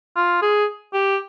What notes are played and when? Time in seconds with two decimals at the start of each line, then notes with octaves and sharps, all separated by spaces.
0.16 F4
0.42 G#4
0.93 G4